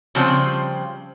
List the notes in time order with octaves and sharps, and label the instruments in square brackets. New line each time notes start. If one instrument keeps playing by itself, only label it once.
[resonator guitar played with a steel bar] C#3 F3 G3 C4